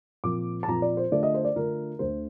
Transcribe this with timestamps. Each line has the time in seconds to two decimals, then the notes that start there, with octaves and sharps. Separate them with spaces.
0.24 A#2 F3 C4 F4 D6
0.63 A5
0.68 A#2 F3 C4 F4 A#5
0.82 D5
0.97 C5
1.11 D3 A3 D4 F4 D5
1.23 D#5
1.34 C5
1.45 D5
1.56 D3 A3 D4 F4 A#4
1.99 D2 D3 A3 C5